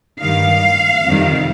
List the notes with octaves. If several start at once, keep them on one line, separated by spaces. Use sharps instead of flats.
G2 D#3 G3 F5
F2 C3 D#3 G3